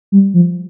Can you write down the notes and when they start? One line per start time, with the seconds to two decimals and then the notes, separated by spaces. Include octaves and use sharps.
0.12 G3
0.34 F3